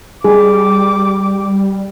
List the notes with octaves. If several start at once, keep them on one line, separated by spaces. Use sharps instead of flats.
G3 G#4 D6